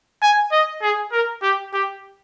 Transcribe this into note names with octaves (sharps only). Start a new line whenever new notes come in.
G#5
D#5
G#4
A#4
G4
G4